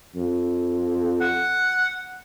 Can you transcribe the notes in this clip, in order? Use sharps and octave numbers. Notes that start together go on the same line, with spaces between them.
F2
F#5